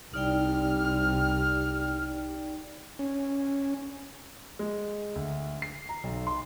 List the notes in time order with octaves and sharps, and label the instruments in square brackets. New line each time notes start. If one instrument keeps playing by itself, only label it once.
[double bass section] C2 [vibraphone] D#4 D5 G5 [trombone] G4 [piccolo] F6
[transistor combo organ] C#4
[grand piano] G#3
D2
C7
A#5
B1
C6